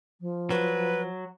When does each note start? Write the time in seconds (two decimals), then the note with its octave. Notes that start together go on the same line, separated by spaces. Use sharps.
0.20 F3
0.51 F#3 B4